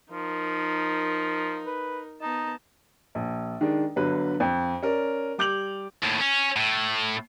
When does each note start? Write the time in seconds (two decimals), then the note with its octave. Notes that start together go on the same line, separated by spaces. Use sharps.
0.11 F3 D#4 A#4
1.66 B4
2.22 B3 D#4 A5
3.15 A#1
3.61 D#3 G#3 D4
3.96 G1 D3 F#3 B4
4.40 F2
4.83 C#4 A#4 D5
5.38 G3 D6 G6 F7 F#7
6.03 D#2 A2
6.20 C#4
6.56 A2